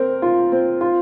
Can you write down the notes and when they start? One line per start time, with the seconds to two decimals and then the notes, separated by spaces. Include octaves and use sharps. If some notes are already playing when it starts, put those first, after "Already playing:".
Already playing: C4 A#4
0.22 F4
0.52 C4
0.81 F4